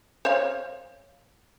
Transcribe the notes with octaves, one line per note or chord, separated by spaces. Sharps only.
C5 C#5 F5